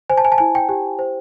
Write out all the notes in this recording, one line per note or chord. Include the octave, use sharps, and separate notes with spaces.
C5 G#5
A5
G#5
A5
E4 G#5
G5
G4
C5